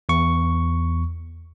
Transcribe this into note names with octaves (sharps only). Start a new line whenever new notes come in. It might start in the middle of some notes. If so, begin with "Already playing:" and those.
E2 C#6